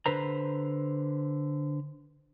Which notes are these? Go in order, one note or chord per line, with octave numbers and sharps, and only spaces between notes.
D3 B4 C5 A#5